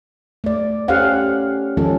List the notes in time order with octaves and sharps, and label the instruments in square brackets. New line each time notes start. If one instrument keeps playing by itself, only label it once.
[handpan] A3 D5
C#4 G4 A4 C5 F5 F#5
D#3 F3 G#3 C#4 F4 A4